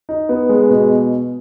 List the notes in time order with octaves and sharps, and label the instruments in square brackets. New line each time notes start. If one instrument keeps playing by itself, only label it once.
[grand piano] D#4
B3
G#3
B2